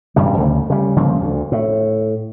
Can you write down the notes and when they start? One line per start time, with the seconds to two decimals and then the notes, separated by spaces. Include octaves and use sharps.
0.16 E1 G2 C#3 G3
0.37 D2 C#3
0.70 C#3 G3
0.96 G1 C#3 F3 A#3
1.21 D2
1.52 A2